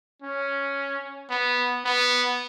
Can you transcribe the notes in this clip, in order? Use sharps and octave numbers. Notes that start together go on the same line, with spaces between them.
C#4
B3
B3